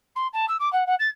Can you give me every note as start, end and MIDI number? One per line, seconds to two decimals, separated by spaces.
0.16 0.27 84
0.33 0.45 81
0.48 0.56 88
0.59 0.71 86
0.73 0.84 78
0.86 0.95 78
0.99 1.08 93